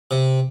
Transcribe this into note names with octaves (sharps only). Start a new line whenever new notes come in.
C3